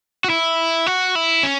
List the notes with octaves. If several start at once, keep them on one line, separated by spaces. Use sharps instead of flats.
F#4
E4
F#4
E4
C#4